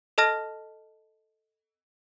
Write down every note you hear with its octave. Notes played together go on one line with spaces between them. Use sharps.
A4 D#5 A5 F6 A#6 E7